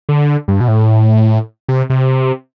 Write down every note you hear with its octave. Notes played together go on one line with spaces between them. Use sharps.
D3
G2
B2
A2
C3
C3